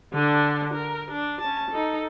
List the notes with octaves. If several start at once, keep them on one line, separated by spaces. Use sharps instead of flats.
D3 D4
A#4
D4
C#4 A5
D#4 A4